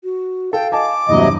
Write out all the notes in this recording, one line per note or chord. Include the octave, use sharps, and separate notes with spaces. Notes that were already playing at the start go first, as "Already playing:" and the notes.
F#4
A4 F5 G5
D#5 G#5 A5 D6
E2 G2 C3 F#3 A#3 D#5